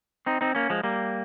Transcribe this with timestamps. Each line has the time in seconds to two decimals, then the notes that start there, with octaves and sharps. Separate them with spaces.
0.26 C4 D#4
0.41 C4 D#4
0.55 A#3 C#4
0.70 F3 G#3
0.83 G3 A#3